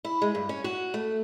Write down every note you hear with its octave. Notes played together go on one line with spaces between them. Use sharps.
E4
G#3
G2
C#4
F#4
A3